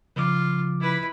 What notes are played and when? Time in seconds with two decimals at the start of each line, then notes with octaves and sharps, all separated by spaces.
0.16 C#3 F3 F4 D6
0.80 E4 B4